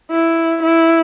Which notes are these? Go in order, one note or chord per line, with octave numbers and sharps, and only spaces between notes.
E4
E4